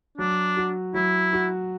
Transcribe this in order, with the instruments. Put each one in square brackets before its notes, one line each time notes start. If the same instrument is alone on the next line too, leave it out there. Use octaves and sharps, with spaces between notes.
[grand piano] F#3 [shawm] D4
[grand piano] F#4
[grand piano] F#3 [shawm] E4
[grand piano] F#4